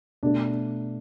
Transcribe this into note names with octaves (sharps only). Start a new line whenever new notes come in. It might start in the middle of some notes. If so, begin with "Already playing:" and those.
B2 A3 D4